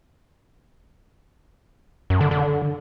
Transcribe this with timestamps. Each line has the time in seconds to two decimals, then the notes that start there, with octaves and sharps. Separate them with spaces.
2.10 F#2
2.21 D3
2.31 D3